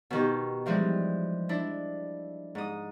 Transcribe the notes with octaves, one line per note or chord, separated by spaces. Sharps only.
B2 D#3 G4
E3 F3 G3 G#3
D4 E4
G#2 D#6